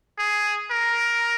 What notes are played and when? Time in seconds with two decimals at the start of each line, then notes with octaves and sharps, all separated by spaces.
0.18 G#4
0.71 A#4